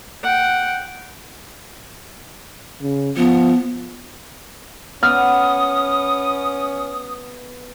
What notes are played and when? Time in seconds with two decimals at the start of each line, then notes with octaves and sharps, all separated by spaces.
0.23 F#5 G5
2.81 C#3
3.17 F3 B3
5.03 B3 C#4 D6 D#6 F6